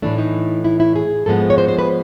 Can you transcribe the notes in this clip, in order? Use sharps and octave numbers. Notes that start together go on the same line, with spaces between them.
A2 E3 A3 D4
D#4
E4
E4
G#4
G#2 F3 G#3 B3 A4
C#5
C5
C5
B4